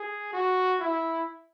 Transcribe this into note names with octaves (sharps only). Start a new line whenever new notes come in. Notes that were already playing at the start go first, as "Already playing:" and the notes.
Already playing: G#4
F#4
E4